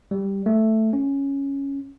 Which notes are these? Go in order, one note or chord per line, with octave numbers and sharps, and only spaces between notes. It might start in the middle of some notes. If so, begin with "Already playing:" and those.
G3
A3
C#4